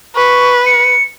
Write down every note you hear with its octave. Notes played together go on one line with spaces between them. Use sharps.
B4 C#6
C#7